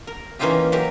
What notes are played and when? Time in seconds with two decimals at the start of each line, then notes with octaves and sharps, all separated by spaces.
0.07 A#4
0.39 E3 A#3 C#4 D#4 F4 G4
0.72 F#3 C#4 G4 A#4